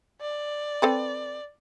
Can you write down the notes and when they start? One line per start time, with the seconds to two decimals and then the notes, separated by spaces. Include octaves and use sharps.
0.21 D5
0.82 C4 A4 B4